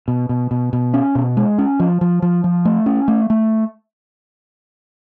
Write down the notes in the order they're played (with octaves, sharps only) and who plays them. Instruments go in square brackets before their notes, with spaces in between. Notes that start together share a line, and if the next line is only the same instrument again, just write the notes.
[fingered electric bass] B2
B2
B2
B2
C#4
B2
G#3
C#4
F3
F3
F3
F3
A3
C#4
A3
A3